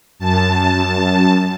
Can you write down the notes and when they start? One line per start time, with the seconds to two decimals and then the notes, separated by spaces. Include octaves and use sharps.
0.19 F#2 A5